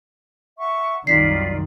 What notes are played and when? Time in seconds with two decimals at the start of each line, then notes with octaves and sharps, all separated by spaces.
0.58 E5 F#5 C#6
1.07 C2 F#2 D#3 C#4 F4 D5 B6 C7